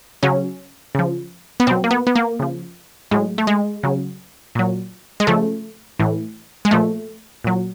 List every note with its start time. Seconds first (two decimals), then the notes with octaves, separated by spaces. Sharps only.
0.23 C#3 F#3 C#4
0.95 C#3 F3
1.60 B3
1.67 B2 F#3 C4
1.84 A#3
1.91 B3
2.07 B3
2.15 A#3
2.39 C#3 F3
3.11 A2 F#3 G#3
3.38 A3
3.47 G#3
3.83 C#3 F#3
4.55 A#2 F#3
5.20 G#3
5.27 C#3 F3 A3
6.00 A2 E3
6.65 G#3
6.71 A#2 F3 A3
7.44 A#2 F#3